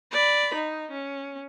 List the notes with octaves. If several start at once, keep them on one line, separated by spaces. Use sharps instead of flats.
D5 B5
D#4
C#4